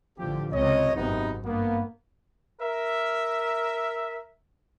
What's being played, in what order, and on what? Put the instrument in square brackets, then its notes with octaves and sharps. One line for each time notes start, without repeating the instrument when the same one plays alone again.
[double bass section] A1 D3 F3 [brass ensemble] G4
[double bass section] C#2 C3 [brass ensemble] C#5 D#5
[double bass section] G#1 F#2 [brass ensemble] C3 B3 D#4
[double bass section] G2 [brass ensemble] A#3 B3
[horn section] A#4 E5